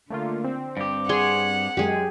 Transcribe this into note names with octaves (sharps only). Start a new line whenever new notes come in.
D3 A3 A#3 F4
C4
G2 G4
G#4 F#5 C6 C#6
F#2 G#3 G4 G#4